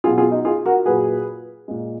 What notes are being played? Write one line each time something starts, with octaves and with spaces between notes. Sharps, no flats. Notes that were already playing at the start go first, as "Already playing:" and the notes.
B2 F#3 F4 G#4
F4 G#4
D#4
F4 G#4
F#4 A#4
A#2 F#3 G#4 B4
A#2 G#3